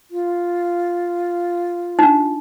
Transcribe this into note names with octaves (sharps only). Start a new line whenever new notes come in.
F4
D4 D#4